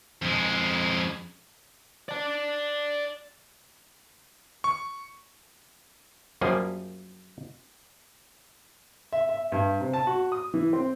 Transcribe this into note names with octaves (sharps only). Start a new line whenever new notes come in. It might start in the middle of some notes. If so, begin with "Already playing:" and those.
F2 G#3
D5 A5
C#6
F#2 F3 G3 A#3 G#4
E5
E5
G2
C3
A5
F#4
D#6
E3
C4